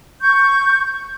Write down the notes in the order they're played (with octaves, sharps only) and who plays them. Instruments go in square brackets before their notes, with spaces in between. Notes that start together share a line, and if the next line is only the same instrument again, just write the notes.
[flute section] C#6 G6